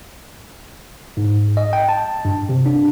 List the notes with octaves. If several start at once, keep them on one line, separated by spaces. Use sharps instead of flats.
G#2
D#5
G5
A5
G2
C3
D4